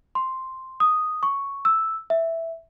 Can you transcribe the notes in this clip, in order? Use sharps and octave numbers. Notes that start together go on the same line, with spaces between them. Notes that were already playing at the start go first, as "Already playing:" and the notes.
C6
D#6
C#6
E6
E5